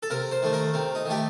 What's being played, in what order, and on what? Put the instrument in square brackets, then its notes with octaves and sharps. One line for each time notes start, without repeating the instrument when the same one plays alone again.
[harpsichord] A4
C3 A#4
C5
D#3 A3
A#4
C3 C4
D#4
D#3 A3 G4